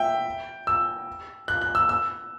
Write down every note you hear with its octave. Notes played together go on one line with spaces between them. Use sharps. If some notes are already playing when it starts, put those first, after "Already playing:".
Already playing: E5 G5
E6
F#6
F#6
E6
E6